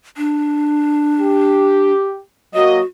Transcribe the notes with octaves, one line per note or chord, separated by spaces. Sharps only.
D4
G4
F#3 A#3 F#4 D#5